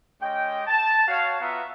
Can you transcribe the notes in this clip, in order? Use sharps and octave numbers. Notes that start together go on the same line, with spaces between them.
G#3 C#4 G4 D#5 G5
A5
F#4 C#5 F5
B3 F4 F#4 E5 F5 A#5